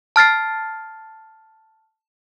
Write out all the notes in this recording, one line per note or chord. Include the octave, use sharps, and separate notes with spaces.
A5 F6 A6 C7